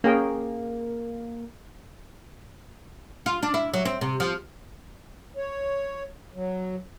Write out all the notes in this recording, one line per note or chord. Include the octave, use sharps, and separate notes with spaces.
A#3 C#4 G#4 G5
F4
D4
E4
F#3
C4
C3
F3
C#5
F#3